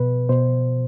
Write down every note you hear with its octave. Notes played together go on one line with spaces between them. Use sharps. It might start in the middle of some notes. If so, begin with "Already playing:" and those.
Already playing: B2 B4
B2 C5